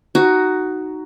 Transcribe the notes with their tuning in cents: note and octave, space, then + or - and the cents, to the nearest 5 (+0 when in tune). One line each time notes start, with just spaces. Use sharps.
D#4 +0 F#4 +10